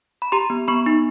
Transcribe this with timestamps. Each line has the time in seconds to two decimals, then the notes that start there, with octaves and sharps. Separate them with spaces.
0.22 B5
0.32 G4 A#5 C6
0.50 B3
0.68 B3 B5 C#6
0.86 D#4